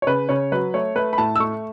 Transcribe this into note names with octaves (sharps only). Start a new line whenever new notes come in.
C#5
C#3 B4
C#3 C#5
F#3 B4
A3 C#5
A3 B4
B5
A2 A5
E6
A3 C#6